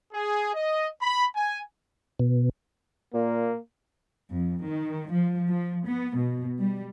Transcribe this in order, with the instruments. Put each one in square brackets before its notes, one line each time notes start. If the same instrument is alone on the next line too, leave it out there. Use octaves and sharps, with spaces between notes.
[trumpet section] G#4
D#5
B5
G#5
[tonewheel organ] B2
[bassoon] A#2 [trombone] A#3
[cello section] F2
D#3
F3
F3
B3
B2
G3